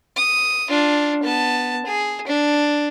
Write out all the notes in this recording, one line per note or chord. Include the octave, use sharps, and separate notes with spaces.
D#6
D4 F4
B3 A5
G#4
D4